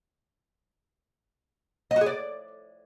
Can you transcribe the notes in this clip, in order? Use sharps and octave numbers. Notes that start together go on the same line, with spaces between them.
D#5
F#4
G#4
D5